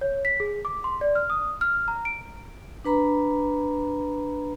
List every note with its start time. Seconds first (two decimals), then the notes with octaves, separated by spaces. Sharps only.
0.01 C#5
0.25 B6
0.40 G#4
0.65 D6
0.84 C6
1.01 D5
1.15 F6
1.30 D#6
1.61 F6
1.88 A#5
2.05 D7
2.85 D4 B4 A#5 B5